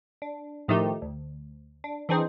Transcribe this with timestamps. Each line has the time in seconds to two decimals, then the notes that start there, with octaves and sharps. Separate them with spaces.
0.22 D4
0.68 A2 D#3 F3 A3 D#4 G4
1.02 D2
1.84 D4
2.09 E3 C4 D4 D#4 G#4 C5